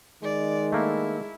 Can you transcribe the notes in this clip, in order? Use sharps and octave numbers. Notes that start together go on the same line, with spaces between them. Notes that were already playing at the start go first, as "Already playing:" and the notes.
D#3 G#3 D5
A3 A#3 E4